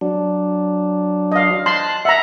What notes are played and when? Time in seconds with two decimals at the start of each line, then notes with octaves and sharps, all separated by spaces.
0.01 F#3 D4
1.32 D#5 F5
1.66 A5 C6 F#6
2.05 E5 F#5 A#5